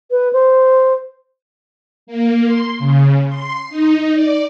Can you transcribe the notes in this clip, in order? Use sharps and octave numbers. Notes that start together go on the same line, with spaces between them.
B4
C5
A#3
C6
C#3
C6
D#4
D5